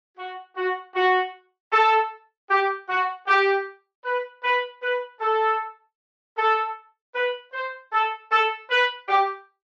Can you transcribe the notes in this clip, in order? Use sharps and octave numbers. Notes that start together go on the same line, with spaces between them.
F#4
F#4
F#4
A4
G4
F#4
G4
B4
B4
B4
A4
A4
B4
C5
A4
A4
B4
G4